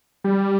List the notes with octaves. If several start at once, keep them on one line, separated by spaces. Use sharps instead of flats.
G3